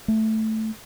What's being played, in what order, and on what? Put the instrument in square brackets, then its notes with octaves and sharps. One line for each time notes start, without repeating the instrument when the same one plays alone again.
[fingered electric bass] A3